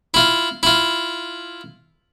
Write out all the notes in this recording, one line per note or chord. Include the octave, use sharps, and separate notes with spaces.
E4 F4
E4 F4